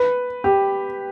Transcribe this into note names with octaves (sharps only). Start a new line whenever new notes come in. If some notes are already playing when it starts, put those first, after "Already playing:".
Already playing: B4
G4